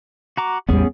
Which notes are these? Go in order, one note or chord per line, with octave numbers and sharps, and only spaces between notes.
F#4 A#5 D6
A1 E2 G3 B3 C#4 G#4